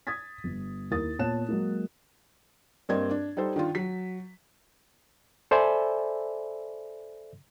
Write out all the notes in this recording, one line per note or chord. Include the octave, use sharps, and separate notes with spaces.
D#6 G#6 A6 B6
G1
D#2 E4 A#4 D#6 A6
A#2 B3 C#5 A5 F#6 E7
F#3 G#3 A#3
G2 A#3 C4 D5 D#5 G#6
D4
G3 D#4 A4 C5
D#3 D4 F4
F#3 B6
A4 C5 D5 E5 G#5 B5